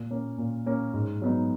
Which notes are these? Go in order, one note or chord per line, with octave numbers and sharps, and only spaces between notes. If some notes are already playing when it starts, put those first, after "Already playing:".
Already playing: A#2
A#3 C#4
A#2
A#3 C#4
G#2
F#3 B3 D#4